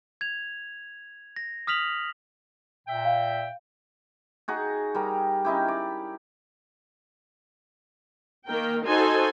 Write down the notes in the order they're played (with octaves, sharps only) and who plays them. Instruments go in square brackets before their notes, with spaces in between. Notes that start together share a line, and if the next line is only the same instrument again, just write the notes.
[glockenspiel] G#6 F7
A#6
D#6 F6 B6 F7 F#7
[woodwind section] A#2 E5 G5
[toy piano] F5
[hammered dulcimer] D#4 F#4 G#4
G3 A#4
C#4 D#4 E4 G4
D5
[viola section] D#3 A#3 A#4 G5
D#4 F#4 A4 C5 G#5